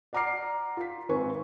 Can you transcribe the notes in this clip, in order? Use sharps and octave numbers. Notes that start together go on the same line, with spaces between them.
D5 F#5 A#5 D6 F6 C7
F4 B6
G#1 C4 B4 G#5 C#6